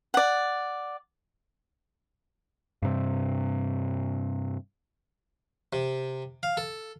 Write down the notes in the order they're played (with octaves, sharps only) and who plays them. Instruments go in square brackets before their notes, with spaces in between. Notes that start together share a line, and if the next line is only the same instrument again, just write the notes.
[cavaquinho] D5 F#5
[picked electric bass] G2 C3
[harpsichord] C3
F5
A4